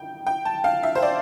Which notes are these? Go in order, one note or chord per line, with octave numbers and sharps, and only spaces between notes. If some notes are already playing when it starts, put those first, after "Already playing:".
Already playing: G5
G5
A5
F5
E5
C5
D5